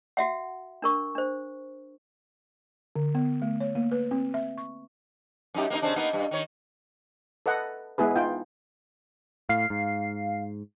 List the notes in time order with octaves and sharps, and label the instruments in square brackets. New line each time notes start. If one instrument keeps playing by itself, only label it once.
[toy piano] F#4 E5 F#5
D4 A#4 C#6
D4 C5
[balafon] D3
B3
A3
C#5
A#3
B4
C4
E5
C#6
[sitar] F#2 D#4 G4
A#3 B3 D#4
C#3 C4 D4
A#3 B3 D#4
G2
D#3 C#5
[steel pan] A4 B4 D#5 F#5
G#3 B3 E4 G#4 B4
D#4 F4 G5
[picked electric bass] A2 [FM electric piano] F5 C7
[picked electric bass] G#2